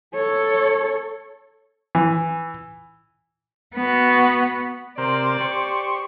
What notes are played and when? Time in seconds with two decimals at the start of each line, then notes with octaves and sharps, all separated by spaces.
0.15 A4 C#5
1.95 E3
3.75 B3 F#4
4.98 C3 A#4 C5 D5
5.40 G4 C5 C#6